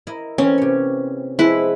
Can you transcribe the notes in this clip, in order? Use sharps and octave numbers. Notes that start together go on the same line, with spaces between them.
E4 A#4 D#5
E3 A#3 C4 C#4
C3 C#5
F3 G#3 E4 B4